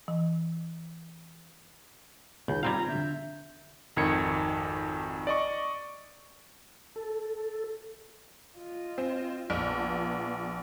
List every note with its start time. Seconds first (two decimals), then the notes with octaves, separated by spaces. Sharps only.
0.08 E3
2.48 C#2 D#3 G6
2.63 G3 C4 F4 F5 G5 A#5 G#6
2.88 D3 E5 G6
3.96 G#1 F2 D#3 G#6 C#7
5.27 D5 D#5 C#6
6.96 A4
8.57 F4 D#5
8.98 C4
9.50 A#1 B3 F4